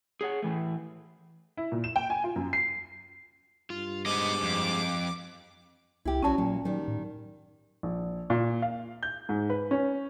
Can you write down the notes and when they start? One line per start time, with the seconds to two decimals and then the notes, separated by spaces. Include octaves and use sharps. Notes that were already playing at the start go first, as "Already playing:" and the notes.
0.21 G#4 C#5 F#5
0.42 A2 E3 A3
1.57 E4
1.72 A#2
1.84 E7
1.96 G5
2.10 G#5
2.24 F4
2.36 F#2
2.53 C7
3.70 G2 F4
4.06 G#3 B3 G#4 C5 D#5 D6
4.43 F2
6.05 C2 E4 G4
6.23 A#1 E2 F#3 C#4 A5
6.38 A#2 F#3
6.65 D#3 F#3 G3
6.88 A2
7.83 A#1
8.30 A#2
8.62 F5
9.03 G6
9.29 G#2
9.50 B4
9.71 C#4